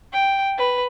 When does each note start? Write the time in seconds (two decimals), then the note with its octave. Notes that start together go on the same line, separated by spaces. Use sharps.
0.11 G5
0.56 B4